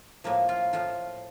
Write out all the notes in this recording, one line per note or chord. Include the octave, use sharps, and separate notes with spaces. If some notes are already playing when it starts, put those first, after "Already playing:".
A2 F3 A#3
F4
A2 F3 F4